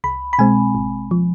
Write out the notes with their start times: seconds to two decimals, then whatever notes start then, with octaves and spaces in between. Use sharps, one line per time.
0.04 C2 B5
0.33 B5
0.39 B2 G#3 C4 G#5
0.75 G#1
1.11 F3